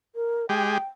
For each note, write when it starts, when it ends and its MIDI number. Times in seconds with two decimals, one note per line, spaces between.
0.15 0.45 70
0.49 0.78 56
0.49 0.78 67
0.49 0.84 79